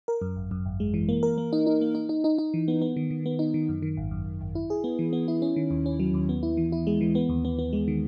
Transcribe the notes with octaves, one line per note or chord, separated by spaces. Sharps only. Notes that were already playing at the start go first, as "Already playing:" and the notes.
A#4
F#2
G#1
F#2
G#1
G#3
E3
A#3
A#4
A#3
D#4
D#4
A#3
D#4
D#4
D#4
D#4
E3
B3
B3
D#3
D#3
B3
D#4
D#3
F#2
D#3
G#1
F#2
G#1
G#1
E4
G#4
B3
E3
B3
E4
C#4
D#3
D#2
C#4
F#3
D#2
B3
E4
E3
E4
G#3
E3
B3
D#2
B3
B3
G#3
D#3